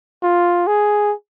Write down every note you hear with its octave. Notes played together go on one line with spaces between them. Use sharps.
F4
G#4